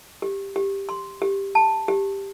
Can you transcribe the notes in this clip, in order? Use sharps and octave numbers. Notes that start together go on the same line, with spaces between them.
G4
G4
C6
G4
A5
G4